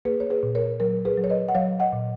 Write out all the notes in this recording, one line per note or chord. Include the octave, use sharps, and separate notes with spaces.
A#3 G#4 B4
C#5
G#4 B4
A#2
A#4 C#5
F#3 A#4
G#4 B4
F#3
C#5
B4 D#5
F#5
F#3 C#5 F5
D#5 F#5
A#2